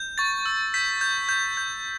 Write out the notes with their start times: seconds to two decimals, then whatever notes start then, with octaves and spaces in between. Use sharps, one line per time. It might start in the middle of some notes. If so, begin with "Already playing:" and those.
Already playing: G6
0.18 C#6 A6
0.46 E6
0.74 G6 B6
1.01 G6
1.29 G6
1.57 G6